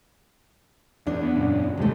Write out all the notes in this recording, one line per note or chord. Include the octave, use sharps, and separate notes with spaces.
E2 D4 D5
B3
F#2 A#2 C#3
A1 D#2 C3 G#3 A3